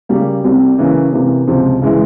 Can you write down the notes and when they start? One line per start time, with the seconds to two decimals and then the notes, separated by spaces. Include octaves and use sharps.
0.09 C#3 G3 A#3
0.44 C2 C3 G3
0.78 C#3 E3 A#3 C#4
1.13 C3 E3 A#3
1.48 C#2 C3 F3
1.82 C#3 E3 G#3 E4